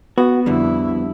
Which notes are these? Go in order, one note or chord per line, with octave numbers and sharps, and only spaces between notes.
B3 F#4
F2 D3 G3 E4